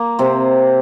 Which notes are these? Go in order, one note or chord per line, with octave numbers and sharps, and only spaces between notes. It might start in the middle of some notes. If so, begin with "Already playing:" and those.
Already playing: A#3
C3 C4